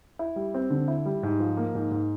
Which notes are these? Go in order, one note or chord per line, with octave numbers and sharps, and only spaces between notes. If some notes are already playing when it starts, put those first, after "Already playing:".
E4
G3
C4
D3
E4
G3
G#2
F3
A#3
G#2
G#2